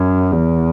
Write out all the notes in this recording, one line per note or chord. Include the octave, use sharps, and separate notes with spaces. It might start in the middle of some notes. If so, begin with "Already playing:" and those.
Already playing: F#2
E2